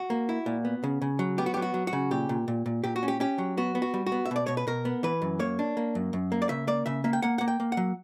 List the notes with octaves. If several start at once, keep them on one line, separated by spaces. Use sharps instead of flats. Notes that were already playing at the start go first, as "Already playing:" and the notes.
Already playing: F#4
A#3
E4
A#2
B3
C#3
C#3
F#3
B3 G4
F#4
F#3 G4
F#4
F#3
F#4
C#3
A#2 G4
A#2
A#2
A#2
A#2 G4
F#4
C#4
G4
C#4 G4
F#3
B3 F#4
B3
F#4
G3
F#4
B3
E5
B2 D5
B2 C#5
B4
B2 A#4
B3
E3 B4
F#2
A#3 C#5
D4
A#3
F#2
F#2
A#3
D5
C#3 E5
A#3 D5
C#3 E5
A#3 E5
G5
A#3 F#5
A#3 F#5
G5
A#3
F#5
F#3